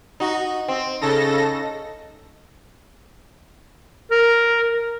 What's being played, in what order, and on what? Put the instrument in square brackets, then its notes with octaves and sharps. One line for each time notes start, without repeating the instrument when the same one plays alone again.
[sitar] D#4 F#4
C4
[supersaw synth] C#3 A4 A#6 [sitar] D#4
[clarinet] A#4